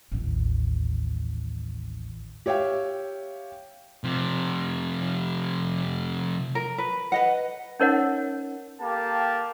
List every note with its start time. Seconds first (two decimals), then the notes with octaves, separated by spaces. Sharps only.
0.12 A1 D#2
2.46 G4 C#5 E5 F5 G5
4.04 C3 F3
6.55 A#4
6.78 B4
7.12 B4 D#5 F#5
7.80 C#4 D#4 A#4 C#5 D#5 F#5
8.81 A#3 G4 A4 G5 A5